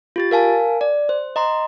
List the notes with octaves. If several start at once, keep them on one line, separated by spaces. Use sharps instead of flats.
F4 G4 A6
A#4 F5 G#5 A5
D5
C5
D#5 A#5 C6